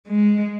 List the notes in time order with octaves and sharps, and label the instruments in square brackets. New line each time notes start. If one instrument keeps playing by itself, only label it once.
[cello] G#3